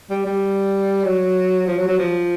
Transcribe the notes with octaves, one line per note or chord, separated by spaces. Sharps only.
G3
G3
F#3
F3
F#3
F#3
F3